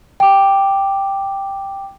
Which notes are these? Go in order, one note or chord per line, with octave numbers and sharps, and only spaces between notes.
G5 D6